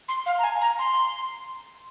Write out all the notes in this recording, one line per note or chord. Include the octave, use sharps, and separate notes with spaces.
C6
F5
A#5
G#5
A#5
C6